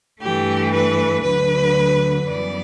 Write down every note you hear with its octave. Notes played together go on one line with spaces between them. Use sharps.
G2 E3 A3 G4
B4
D2 D3 F#3 B4
F#2 E3 G3 B3 D5